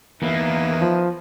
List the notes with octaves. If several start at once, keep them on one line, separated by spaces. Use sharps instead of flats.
E2 D#3 A#3 E4 B4
F3